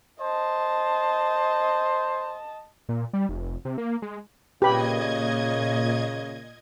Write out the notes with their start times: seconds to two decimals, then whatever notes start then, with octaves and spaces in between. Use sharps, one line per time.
0.21 C5 D#5 A5
2.89 A#2
3.13 G3
3.29 F1
3.65 C3
3.78 A#3
4.02 G#3
4.62 A#2 C#3 G4 B4 D#5 B5 G#6